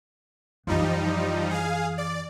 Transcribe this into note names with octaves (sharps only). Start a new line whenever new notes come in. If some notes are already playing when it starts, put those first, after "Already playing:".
F#2 E3 F3 G3 D#4
G#4 F5
D5